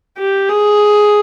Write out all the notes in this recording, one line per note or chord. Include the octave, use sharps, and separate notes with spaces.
G4
G#4